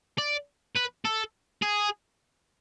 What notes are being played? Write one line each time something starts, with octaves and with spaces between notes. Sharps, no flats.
D5
B4
A4
G#4